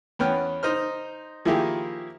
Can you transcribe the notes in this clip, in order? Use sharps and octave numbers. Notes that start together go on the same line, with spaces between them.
E2 B3 C#4 G5 F6
D#4 C5 F6
D#3 F3 A#3 E4 G4 G#4